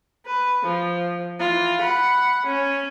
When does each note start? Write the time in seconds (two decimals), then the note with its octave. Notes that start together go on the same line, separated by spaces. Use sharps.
0.26 B4
0.64 F3
1.39 E3 F4
1.81 F#5 B5
2.47 C#4